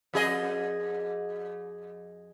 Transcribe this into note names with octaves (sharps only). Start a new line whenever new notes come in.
F2 G#4 D#5